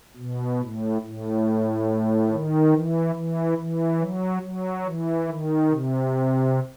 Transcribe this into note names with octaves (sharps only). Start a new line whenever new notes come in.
B2
A2
A2
D#3
E3
E3
E3
F#3
F#3
E3
D#3
C3